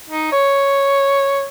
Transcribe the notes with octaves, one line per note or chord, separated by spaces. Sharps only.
D#4
C#5